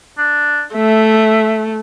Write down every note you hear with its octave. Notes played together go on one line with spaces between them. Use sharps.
D4
A3 E5